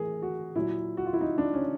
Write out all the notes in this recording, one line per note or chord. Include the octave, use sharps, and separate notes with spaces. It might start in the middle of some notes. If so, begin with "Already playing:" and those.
Already playing: A2 E3 G#4 A#4
F#4
A#2 F#3 E4
F#4
F4
E4
D#4
D4
C#4